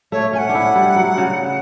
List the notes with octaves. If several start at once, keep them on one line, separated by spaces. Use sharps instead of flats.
A3 C#5
C#4 F#5 G#5
D4
E4
G3
F#3
C#3